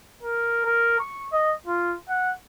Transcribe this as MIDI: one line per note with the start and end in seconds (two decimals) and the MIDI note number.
0.23 0.62 70
0.65 0.98 70
1.00 1.25 85
1.33 1.54 75
1.66 1.95 65
2.09 2.32 78